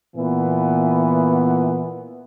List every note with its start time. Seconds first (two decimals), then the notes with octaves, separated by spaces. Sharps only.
0.15 A#2 E3 B3